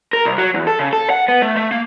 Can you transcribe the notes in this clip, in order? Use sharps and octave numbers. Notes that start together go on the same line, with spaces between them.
A#4
C2
F#3
E2
A4
C#3
A4
F#5
B3
A3
A3
A#3